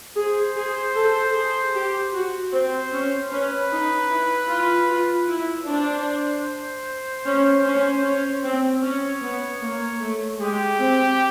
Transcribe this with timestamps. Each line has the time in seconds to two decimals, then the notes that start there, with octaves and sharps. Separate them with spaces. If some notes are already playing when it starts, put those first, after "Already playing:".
0.16 G#4 C5
0.56 G#4
0.95 A4
1.35 G#4
1.75 G4
2.13 F#4
2.52 C4 C5
2.92 C#4
3.31 C#4 B4
3.72 D#4
4.10 E4
4.50 F4
4.89 F4
5.29 E4
5.67 D4 C5
7.25 C#4
7.65 C#4
8.04 C#4
8.44 C4
8.82 C#4 C#5
9.22 B3
9.61 A#3
10.01 A3
10.40 G#3 G4
10.80 C4